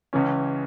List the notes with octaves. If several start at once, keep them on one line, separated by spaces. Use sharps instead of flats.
C#2 C#3 E3 C#4